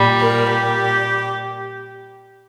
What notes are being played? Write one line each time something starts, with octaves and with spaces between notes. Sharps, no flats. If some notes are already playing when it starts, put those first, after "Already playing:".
Already playing: A#2 G3
A#4
G4